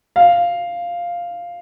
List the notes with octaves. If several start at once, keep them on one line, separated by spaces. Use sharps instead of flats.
F5